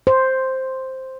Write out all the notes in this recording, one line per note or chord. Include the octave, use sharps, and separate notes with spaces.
C5